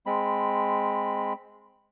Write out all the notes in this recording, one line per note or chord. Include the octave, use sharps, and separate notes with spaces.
G#3 C4 B5